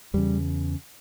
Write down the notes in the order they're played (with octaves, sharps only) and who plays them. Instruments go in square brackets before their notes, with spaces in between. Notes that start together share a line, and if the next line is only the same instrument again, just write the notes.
[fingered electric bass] E2 C#3 G3